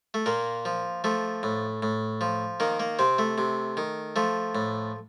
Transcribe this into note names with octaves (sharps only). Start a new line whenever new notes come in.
A3
A#2 A#3
F3
F3 A3
A2
A2
F3
D#3 A#3
A#3
C3 C4
A3
C3
D#3
F3 A3
A2